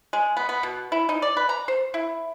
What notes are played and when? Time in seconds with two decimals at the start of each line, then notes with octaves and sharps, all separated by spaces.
0.13 G#3
0.37 B3
0.49 B3
0.63 B2
0.92 E4
1.09 D#4
1.22 D5
1.37 B4
1.49 A#5
1.68 C5
1.94 E4